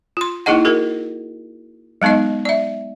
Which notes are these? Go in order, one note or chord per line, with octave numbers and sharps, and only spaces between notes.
F4 C6
A#3 D#4 E4 G#4 D#5 F#5
F#4 G#4 A#4
F#3 G#3 B3 D#4 D#5
D5 E5